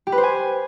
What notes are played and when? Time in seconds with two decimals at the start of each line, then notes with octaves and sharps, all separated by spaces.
0.07 G4
0.12 B4
0.18 C5
0.23 G#5